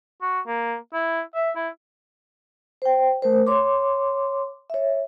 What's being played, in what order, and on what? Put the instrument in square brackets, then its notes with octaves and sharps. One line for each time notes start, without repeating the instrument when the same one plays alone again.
[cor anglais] F#4
A#3
E4
E5
E4
[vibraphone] C5 G5
A3 A#4 C5
C#5 C6 D6
C#5 E5